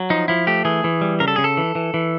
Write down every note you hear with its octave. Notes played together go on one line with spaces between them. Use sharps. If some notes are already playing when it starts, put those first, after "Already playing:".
Already playing: F#3
F3 D#4
F3 E4
A3 G4
E3 G#4
E3
G3
C#3 A#4
A4
C#3 G#4
A4
E3
E3
E3